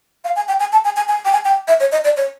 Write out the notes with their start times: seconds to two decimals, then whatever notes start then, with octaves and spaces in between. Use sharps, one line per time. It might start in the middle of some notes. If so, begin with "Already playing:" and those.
0.25 F5
0.36 G#5
0.48 G5
0.60 G#5
0.72 A5
0.84 G#5
0.96 G#5
1.08 G#5
1.25 G5
1.33 G#5
1.45 G5
1.68 E5
1.80 C#5
1.92 D#5
2.04 D5
2.17 C#5